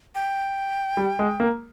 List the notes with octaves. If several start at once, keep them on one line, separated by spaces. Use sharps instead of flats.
G5
G3
G#3
A#3